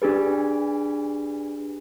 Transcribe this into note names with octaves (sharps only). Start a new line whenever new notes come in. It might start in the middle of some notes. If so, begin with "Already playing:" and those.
D4 G4 G#4 B4